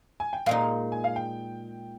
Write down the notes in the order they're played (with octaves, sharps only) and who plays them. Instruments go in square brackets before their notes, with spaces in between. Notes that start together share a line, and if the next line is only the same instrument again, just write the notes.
[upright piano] G#5
G5
[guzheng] A#2 G#3 D#4 [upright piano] F5
[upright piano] G#5
F5
G5